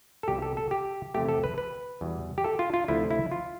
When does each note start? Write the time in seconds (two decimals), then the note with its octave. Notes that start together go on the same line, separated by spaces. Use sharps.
0.23 A4
0.28 C2 B2 G3 G4
0.42 A4
0.57 A4
0.71 G4
1.14 E2 C3 F3 A3 G4
1.29 A4
1.44 B4
1.58 B4
2.01 E2 B2 G3
2.38 G4
2.44 A4
2.59 F4
2.74 F4
2.88 D2 C3 F3 A3 E4
3.11 E4
3.31 F4